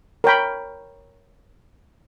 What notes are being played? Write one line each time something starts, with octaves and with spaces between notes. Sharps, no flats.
A#4 C#5 G5 B5